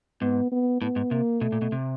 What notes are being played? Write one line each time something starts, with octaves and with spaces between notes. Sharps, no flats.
G#2 B3
B3
A2 B3
G#2
C3 A#3
B2 A3
A#2
B2
C3